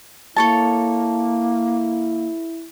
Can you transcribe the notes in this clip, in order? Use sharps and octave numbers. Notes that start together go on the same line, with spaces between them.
A#3 E4 A4 C#5 A5